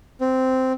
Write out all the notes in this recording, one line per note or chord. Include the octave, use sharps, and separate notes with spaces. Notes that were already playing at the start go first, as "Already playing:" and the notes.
C4